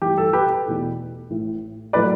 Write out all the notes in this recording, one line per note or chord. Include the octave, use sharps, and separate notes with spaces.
A1 G2 E3 G4
A4
G4 B4
E2 B2 A3 E4
A1 A2 E3
A2 F#3 A3 B4 D5